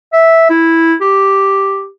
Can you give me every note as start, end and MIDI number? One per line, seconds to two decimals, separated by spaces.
0.13 0.49 76
0.50 0.94 64
1.01 1.88 67